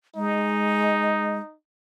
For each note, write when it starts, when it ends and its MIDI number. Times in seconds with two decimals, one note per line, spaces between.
0.15 1.39 56
0.15 1.54 63